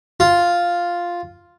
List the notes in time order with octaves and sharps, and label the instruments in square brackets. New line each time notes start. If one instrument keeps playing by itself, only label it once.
[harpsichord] F4